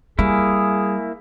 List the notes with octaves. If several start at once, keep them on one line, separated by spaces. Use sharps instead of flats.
G3 A#3 E4 G#4